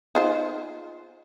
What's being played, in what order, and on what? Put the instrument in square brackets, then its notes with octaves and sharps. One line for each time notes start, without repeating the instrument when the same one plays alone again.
[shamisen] D#4 F4 C5